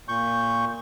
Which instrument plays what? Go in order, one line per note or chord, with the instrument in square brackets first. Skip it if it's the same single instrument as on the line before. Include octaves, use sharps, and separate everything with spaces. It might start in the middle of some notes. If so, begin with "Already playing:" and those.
[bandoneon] A#2 C#6 G6